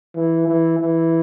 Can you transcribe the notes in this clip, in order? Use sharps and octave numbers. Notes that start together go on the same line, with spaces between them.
E3
E3
E3